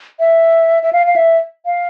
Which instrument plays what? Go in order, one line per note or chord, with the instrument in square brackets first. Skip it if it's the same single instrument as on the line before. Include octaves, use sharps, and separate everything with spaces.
[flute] E5
E5
F5
F5
E5
F5